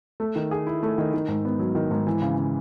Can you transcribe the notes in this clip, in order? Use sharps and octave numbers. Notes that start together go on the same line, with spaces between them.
A3
D#3
G#4
E4
A3
D#3
D#3
G#2
B3
F#3
D#3
G#2
E3
C#3
C#3